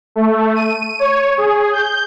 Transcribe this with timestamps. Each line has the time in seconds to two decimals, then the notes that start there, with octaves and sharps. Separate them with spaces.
0.16 A3
0.55 D#7
0.99 C#5
1.38 G#4
1.73 G6